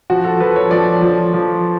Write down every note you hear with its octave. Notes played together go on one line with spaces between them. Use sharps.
F3 F#4
A4
F3 B4
C#5
F3 D5
F3
F3